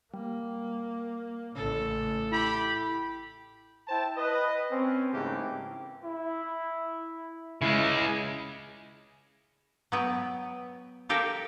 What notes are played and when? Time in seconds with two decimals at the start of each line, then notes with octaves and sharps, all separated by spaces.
0.14 G3 A#3
1.55 A1 A2 C#3 A4
2.32 E4 G4 B5
3.88 E4 C5 G5 A5
4.17 B4 D#5
4.71 C4 C#4
5.13 G#2 C#3 E3 A3 A#3 G4
6.04 E4
7.62 C#3 G#3 E4
9.92 F#3 B3 G5
11.09 F4 G4 A4 A#4 F5 G5